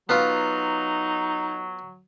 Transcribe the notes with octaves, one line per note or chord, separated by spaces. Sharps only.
F#3 B3 D#4 F4